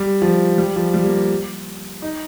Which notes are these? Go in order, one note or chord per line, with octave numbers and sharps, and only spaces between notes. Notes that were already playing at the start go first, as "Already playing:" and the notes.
Already playing: G3
F3
G3
F3
G3
A#3
D#4